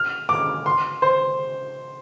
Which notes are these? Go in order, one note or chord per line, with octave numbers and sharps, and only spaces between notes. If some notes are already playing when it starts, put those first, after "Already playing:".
Already playing: F6
D6
C6
C5